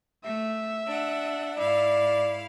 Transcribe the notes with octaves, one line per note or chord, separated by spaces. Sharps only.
A3 E5
D4 F#5
G#2 E4 D5 F5